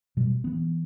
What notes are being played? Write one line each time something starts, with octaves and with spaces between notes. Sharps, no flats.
B2 G3
E3 B3